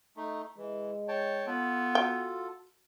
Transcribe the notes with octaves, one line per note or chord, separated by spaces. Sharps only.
A3 D#4
E3 G#3
C#5 G5 A5
B3 F4 A4
F#4 G5